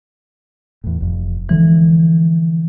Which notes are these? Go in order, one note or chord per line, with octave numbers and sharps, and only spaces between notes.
E2 A2
F1 F2
D3 E3 F3 G#3